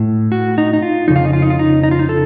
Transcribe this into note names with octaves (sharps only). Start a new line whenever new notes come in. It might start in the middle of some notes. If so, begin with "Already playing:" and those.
Already playing: A2
F#4
D#4
D#4
F4
F2 C#3 D#4
F4
D#4
F4
D#4
F4
D#4
D#4
F4
D#4
A4